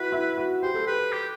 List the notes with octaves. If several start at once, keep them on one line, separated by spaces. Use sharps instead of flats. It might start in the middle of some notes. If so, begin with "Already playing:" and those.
Already playing: E4 F#4 B4
E4
F#4
G4 C5
A4
G4 B4
G4